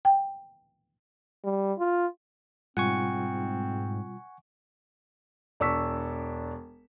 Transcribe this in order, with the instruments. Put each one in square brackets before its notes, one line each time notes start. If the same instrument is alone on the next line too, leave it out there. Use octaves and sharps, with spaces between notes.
[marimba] G5
[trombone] G3
F4
[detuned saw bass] G#2 [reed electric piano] B2 G3 F4 [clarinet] C4 [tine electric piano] F#5 G#5 C#6
[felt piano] E1 D4 C#6 E6 B6